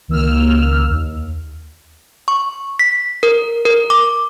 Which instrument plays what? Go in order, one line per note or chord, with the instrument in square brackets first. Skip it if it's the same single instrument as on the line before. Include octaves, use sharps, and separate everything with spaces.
[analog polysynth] C#2 D#3 A#3 E6 F6
D#2
[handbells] C#6
B6
A#4
A#4
D6